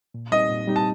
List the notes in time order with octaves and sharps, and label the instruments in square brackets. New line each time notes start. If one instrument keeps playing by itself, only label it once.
[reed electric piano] A#2
[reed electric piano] G3 C4 D#4 G4 [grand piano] D#5
[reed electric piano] A#2
G3 C4 D#4 G4
[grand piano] A5